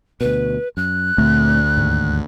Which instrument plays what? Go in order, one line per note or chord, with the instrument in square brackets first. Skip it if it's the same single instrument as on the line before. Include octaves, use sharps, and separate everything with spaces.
[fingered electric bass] D2 B2 [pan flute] B4
[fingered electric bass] F#2 [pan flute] F#6
[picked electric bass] D2 [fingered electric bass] A#2 A3 C4
[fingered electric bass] D#2 G#2